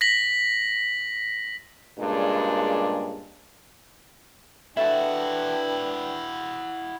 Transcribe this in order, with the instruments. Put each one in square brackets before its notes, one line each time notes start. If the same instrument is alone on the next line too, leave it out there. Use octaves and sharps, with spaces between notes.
[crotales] A#6 B6 F#7
[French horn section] G2 A#2 C#3 G3 G#3 D4
[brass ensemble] D4 B4 G5 [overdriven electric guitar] E4 F#4 [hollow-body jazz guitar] A4 E5